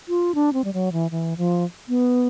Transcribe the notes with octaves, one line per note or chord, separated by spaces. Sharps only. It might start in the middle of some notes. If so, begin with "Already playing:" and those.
F4
D4
C4
G3
F#3
E3
E3
F3
B3